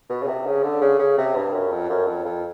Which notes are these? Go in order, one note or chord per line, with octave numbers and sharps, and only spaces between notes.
B2
C#3
C3
C#3
D3
C#3
C#3
C3
G2
F#2
F2
F#2
F2
F2